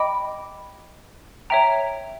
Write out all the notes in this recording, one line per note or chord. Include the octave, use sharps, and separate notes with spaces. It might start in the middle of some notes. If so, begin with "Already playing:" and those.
Already playing: D#5 G5 B5 D6
C#5 E5 G5 A#5